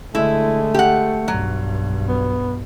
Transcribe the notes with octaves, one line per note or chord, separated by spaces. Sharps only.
D3 G#3 A3 E4
G4 F#5
B1 G2 F#3
B3